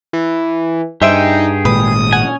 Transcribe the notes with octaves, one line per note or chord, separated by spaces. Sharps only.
E3
G2 D#4 G4 G#4 C5 E5 G5
G#1 A#2 G#3 B4 D#6
C#4 F#5 G#5